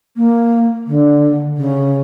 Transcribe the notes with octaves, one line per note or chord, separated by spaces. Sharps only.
A#3
D3
C#3